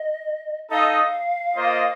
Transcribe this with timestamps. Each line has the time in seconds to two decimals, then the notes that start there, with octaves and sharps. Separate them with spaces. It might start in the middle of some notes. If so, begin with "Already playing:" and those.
Already playing: D#5
0.70 D#4 A4 D#5 F5
1.55 A#3 F4 C5 D#5